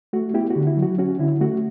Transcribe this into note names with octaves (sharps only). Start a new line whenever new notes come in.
A3 F#4
B3 E4 G4
F#4
D3
E4
F#3
F#4
C#4 F#4
D3 E4
A3 F#4